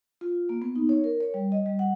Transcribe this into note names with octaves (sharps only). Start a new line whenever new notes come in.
F4
A#3
B3
D#4
C#5
A#4
C#5
G3
D#5
G3
F#5